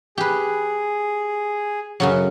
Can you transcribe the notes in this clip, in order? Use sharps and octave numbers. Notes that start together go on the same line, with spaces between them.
G4 G#4 B4
F#2 C#3 F#3